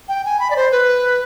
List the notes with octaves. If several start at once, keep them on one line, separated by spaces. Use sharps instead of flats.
G5
G#5
B5
D5
C5
B4